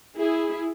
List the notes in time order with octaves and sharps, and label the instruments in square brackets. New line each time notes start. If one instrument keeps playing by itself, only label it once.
[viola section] E4 G#4